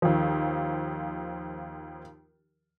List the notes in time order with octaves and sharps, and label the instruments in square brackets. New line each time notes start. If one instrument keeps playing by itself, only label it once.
[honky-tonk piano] D#2 F3